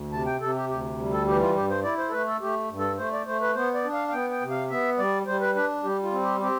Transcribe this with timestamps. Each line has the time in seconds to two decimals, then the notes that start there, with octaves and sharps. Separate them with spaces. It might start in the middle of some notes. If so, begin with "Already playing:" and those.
Already playing: D2
0.12 C3 A5
0.26 G5
0.41 C3 A4
0.55 G4
0.69 D2 G4
0.98 G3
1.13 A4
1.27 E3 G4
1.41 F4
1.56 G2 G4
1.70 C5
1.84 E4 D5
1.98 C5
2.09 A4
2.12 A3 B4
2.27 A4
2.41 A3 G4
2.70 G2
2.79 A4
2.98 A3 C5
3.12 D5
3.27 A3 C5
3.41 B4
3.55 B3 C5
3.74 D5
3.84 D4
3.93 F5
4.08 F5
4.12 B3 G5
4.31 G5
4.41 C3
4.51 F5
4.70 B3 E5
4.98 G3 D5
5.27 G3 C5
5.41 B4
5.55 D4 B4
5.84 G3 G4
6.03 F4
6.12 C4
6.22 G4
6.41 C4 G4